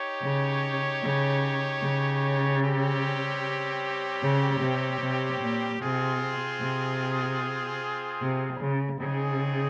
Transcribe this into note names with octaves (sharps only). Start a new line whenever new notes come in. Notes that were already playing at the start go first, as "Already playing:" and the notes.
Already playing: D#4 G4 C#5
C#3
C#3
C#3
G3 C4 G4 C#5
C#3
C3
C3
A#2
C3 C4 F4 G#4 C5
C3
C3
C#3
C#3 C4 D#4 G#4